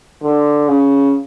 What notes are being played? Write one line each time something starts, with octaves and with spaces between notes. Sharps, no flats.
D3
C#3